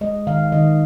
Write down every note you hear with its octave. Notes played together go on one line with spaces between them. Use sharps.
G#3 D#5
D#3 F5
D#3 D#5